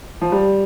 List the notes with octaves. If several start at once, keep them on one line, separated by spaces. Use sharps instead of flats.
F3
G3